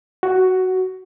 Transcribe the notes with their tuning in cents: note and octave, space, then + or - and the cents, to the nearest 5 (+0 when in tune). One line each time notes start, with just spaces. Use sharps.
F#4 +10